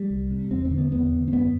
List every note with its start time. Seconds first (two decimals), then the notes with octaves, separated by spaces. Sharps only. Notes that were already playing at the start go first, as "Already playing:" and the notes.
Already playing: G3
0.10 C2
0.31 C3
0.51 E2 C4
0.65 C4
0.71 D3
0.78 B3
0.92 E2 B3
1.13 D3
1.28 C4
1.33 F#2 B3